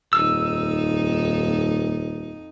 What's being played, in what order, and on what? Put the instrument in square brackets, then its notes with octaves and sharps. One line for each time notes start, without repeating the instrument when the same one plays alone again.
[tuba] D#1 [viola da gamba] F2 D#4 [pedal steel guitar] E6